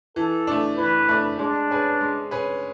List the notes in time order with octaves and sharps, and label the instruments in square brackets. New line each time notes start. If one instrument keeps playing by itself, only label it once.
[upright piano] E3 [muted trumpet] A4
[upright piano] A3 D4
[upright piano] E3 [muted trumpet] B4
[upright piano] A3 D4
[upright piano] G#3 [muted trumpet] D4
[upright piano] C#4 G#4 B4
G#3
C#4 G#4 B4